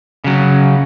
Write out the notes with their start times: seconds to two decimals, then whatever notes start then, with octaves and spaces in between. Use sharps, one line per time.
0.24 C#3 F#3